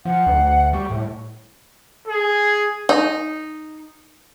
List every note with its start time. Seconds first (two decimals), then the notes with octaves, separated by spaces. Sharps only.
0.05 F3 F5 F#5
0.26 D2
0.73 G3 G5 C#6
0.90 A2
2.07 G#4
2.89 D#4